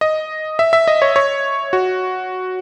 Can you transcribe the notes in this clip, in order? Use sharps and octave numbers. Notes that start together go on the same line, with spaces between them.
D#5
E5
E5
D#5
C#5
C#5
F#4